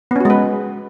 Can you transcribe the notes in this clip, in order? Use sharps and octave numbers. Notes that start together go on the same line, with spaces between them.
G#3 B3 C#4 F#4 B4